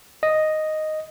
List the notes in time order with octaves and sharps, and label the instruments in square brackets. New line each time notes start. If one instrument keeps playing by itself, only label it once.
[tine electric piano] D#5